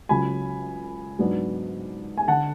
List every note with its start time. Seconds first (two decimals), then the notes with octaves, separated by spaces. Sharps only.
0.09 C#2 C#3 F#3 C#4 G#5 B5
1.19 G#2 F#3 B3 D4
2.17 G#5
2.28 D3 F#5 A5